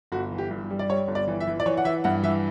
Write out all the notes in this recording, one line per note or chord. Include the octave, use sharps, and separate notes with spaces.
G1 F#4
E3
G4
G2
G3
D5
G3 C#5
G1
D5
E3
E5
E3
D5
E3 C#5
F#5
E3 E5
G2 F#5
E3 E5